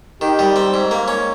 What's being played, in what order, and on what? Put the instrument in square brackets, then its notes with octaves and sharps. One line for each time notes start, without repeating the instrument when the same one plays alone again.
[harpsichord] D#3 [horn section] D#4 G4
[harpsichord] G3
C4
G#2
A#3
C#4